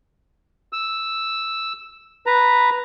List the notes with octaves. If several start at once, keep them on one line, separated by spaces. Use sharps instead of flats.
E6
B4 A#5